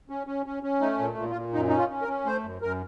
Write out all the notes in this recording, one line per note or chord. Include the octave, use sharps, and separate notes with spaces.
C#4
C#4
C#4
C#4
A3 D#4
A#2
A#2
F4
A#2
F#2 D#4
C#4 D#4
F4
C#4
A#4
C#4
A3 C5
F#2
F#2 A#4